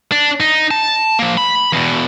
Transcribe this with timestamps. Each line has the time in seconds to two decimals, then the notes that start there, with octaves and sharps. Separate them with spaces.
0.12 D4
0.40 D#4
0.71 A5
1.19 F3 A#3
1.37 B5
1.73 E2 B2